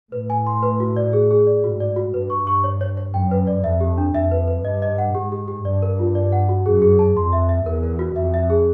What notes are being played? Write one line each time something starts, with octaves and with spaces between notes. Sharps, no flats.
A2 B4
G#5
C6
B4
F#4
D5
G#4
G#4
D5
G#2 F#4
D5
F#4
G2 B4
C#6
C#6
C#5
C#5
C#5
F#2 G5
B4
D5
F2 E5
G4
D4
F2 E5
B4
B4
G2 D#5
D#5
F#5
G#2 G4
G4
G4
G2 D5
A#4
F4
D5
F#5
F#4
F#2 G#4
G#4
A5
F2 C6
E5
E5
E2 A#4
A#4
F#4
F2 E5
E5
G#4